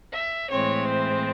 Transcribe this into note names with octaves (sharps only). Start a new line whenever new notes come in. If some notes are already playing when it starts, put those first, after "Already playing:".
E5
A2 E3 G#3 C4 C#5
C5